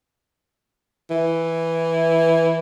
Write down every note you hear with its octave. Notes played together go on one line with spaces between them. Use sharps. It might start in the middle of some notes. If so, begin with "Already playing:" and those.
E3